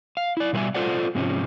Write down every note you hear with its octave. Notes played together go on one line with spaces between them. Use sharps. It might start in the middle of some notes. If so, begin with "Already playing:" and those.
F5
E4 D5
B2 G3 G#4 B4 E5 G#5
F4 A4 C5 D5 F#5
G#2 C3 F3 G#3 C#4